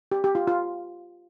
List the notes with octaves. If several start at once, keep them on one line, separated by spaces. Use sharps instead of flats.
G4
G4
F4
F4